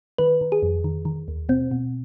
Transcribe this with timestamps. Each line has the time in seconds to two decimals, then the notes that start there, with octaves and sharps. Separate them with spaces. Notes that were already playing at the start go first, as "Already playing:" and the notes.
0.18 D#3 B4
0.41 D#3
0.52 G#4
0.63 F2
0.84 D#3
1.05 D#3
1.28 D#2
1.49 B2 C4
1.71 B2